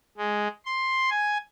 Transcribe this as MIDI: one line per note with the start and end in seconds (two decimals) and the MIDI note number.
0.18 0.48 56
0.66 1.10 84
1.10 1.38 80